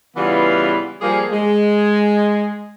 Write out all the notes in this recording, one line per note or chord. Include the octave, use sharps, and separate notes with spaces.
C#3 E3 G3 B3 E4 F4
F3 G3 A#3 G#4
G#3